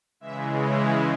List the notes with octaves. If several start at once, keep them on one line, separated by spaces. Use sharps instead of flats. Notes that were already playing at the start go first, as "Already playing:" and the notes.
C#3 E3 G#3 E5
C#5